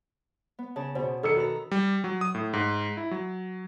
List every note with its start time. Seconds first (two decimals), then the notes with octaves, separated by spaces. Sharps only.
0.59 B3
0.76 C#3 A5
0.95 B2 C5
1.23 D#3 A4 E6 C#7
1.36 F#4 A4 B4 A#5
1.71 G3
2.04 F#3
2.21 D#6
2.35 A2
2.53 G#2
2.97 E4
3.11 F#3